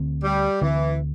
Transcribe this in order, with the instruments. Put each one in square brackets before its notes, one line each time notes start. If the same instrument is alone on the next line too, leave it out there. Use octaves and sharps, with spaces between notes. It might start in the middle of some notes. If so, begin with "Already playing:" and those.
Already playing: [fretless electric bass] D2 D3 C4
[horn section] G3
[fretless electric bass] D2 D3 C4 [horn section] E3